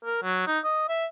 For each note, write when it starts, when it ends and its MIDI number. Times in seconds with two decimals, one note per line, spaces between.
0.04 0.20 70
0.23 0.46 54
0.47 0.59 63
0.64 0.88 75
0.89 1.06 76